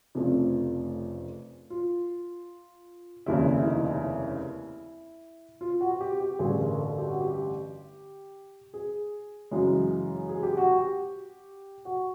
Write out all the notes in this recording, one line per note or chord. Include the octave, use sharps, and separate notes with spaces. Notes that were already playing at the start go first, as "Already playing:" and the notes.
F1 F2 C#3 F3 A3
F4
F1 D#2 C#3 E4
E4
E4
D#4
E4
F4
F#4
F#4
G4
G4
A1 G2 D3 G#4
A#4
A4
G4
F#4
G4
G#4
F#2 C#3 E3 G#3
G#4
G4
F#4
G4
F#4